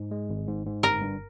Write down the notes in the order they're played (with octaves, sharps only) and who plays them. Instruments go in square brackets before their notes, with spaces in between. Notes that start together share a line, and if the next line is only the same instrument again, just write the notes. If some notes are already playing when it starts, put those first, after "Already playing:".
Already playing: [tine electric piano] G#2
G#3
G#1
G#2
G#2
[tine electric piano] G1 [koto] A#4
[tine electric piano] G2